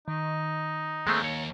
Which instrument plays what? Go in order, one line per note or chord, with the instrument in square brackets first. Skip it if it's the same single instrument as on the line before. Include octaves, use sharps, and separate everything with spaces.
[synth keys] D#3 [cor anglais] D#4
[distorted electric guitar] D#2 [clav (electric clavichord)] G#3 A3 C4
[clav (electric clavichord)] C#5